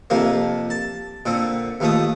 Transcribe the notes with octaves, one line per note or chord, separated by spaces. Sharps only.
F2 C3 F3 A#3
A5
A#2 D3 C4
D#2 F3 A3 D#6